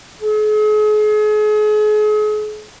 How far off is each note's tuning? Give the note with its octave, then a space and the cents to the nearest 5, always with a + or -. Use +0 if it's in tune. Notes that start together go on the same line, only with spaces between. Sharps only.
G#4 +40